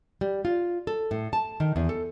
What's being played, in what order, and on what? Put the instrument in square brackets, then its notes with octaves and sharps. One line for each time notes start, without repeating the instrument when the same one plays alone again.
[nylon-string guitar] G3
F4
A4
A2
A5
D#3
E2
A4